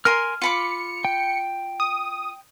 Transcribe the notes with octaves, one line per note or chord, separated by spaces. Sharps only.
A#4 G#5 C6 F6
F4 B5 D6 C#7
G5
D#6